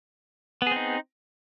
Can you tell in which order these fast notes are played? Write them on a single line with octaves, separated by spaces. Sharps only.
B3 G#4 C4 D#4